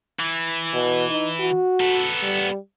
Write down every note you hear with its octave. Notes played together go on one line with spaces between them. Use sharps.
E3
B2
D#4
F#4
B3 A4
G3